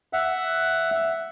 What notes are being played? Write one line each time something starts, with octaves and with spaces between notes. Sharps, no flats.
E5 F#5